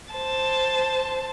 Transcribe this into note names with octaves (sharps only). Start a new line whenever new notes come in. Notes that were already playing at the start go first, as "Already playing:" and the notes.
C5 A5